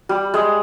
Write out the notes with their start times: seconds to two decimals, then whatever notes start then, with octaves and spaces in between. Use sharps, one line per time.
0.09 G3
0.34 G#3